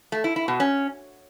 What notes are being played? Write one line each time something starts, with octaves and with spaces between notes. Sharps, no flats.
A3
E4
E4
B2
C#4